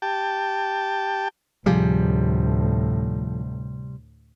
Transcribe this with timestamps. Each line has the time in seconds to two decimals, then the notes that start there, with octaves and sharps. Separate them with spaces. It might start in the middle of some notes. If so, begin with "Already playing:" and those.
0.02 G4 G5 A5
1.66 D2 A2 C3 F3 G3 G#4